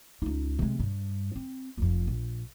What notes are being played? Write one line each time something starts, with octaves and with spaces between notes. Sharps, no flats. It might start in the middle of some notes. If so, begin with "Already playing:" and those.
C#2 D#4
C3 G#3
G2
C4
F1 F2
A#1